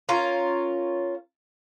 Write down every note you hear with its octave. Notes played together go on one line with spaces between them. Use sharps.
C#4 F4 A#4